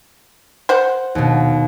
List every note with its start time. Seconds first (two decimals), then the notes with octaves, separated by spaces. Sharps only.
0.69 C5 F#5
1.15 D#2 B2